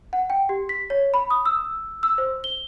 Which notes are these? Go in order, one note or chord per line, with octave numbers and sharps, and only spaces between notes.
F#5
G5
G4
B6
C#5
B5
D#6
E6
E6
C5
G7